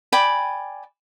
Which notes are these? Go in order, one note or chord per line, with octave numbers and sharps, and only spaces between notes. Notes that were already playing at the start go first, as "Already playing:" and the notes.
D5 G5 G#5 B5